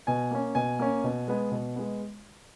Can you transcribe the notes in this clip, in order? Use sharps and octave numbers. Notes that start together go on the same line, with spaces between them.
B2 G#5
A#3 C#4
B2 G#5
A#3 C#4
B2
G#3 B3
B2
G#3 B3